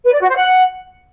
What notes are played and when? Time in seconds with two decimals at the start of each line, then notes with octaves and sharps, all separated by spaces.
0.04 B4
0.12 D5
0.21 F#4
0.29 C5
0.37 F#5